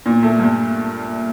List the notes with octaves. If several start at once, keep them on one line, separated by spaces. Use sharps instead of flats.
A#2
A3
G2